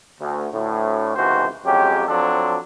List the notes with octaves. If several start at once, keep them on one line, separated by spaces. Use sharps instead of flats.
D2
D2 A2
C#2 C3 D#3 E3 F#4 C5
F2 F#3 G#3 C#4 G4
F3 F#3 C4 D4 A4